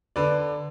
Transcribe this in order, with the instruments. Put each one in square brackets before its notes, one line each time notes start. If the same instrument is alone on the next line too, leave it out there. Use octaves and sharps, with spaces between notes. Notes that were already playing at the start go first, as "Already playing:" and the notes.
[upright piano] D3 B4 D5